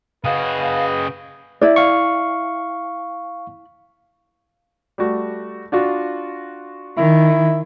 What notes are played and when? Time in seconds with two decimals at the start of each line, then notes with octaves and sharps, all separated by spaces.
0.24 C#3 F#4 G#4 B4 D#5 F5 G5
1.61 E4 D5
1.76 F5 C#6
4.98 G3 A3 F#4
5.72 D4 F4 F#4
6.97 D#3 E4